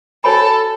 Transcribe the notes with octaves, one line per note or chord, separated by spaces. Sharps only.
F#4 A4 C#5 G#5 B5